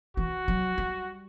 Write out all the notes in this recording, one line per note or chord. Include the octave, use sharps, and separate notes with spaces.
E3 F#4
F#3
G3